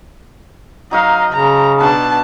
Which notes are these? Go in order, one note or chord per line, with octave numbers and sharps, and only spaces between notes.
F#3 D#4 A#4 D#5 F5
C#3 A#5
B2 B3 D4 A5